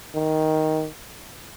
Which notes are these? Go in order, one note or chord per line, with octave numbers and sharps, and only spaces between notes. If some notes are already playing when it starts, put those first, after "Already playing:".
D#3